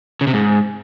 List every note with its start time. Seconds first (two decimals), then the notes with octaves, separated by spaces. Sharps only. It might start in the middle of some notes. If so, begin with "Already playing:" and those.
0.21 C#3
0.27 C3
0.33 G#2